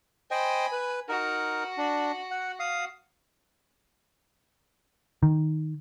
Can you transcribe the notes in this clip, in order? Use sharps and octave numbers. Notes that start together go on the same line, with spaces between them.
C5 D#5 G5 G#5 B5
B4
D#4 F#4 A#4
D4
F#5
F5 D#6
D#3